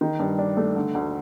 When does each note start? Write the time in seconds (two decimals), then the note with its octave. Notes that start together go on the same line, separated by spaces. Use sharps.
0.01 D#3
0.19 G2
0.38 D4
0.57 A3
0.76 D3
0.94 D2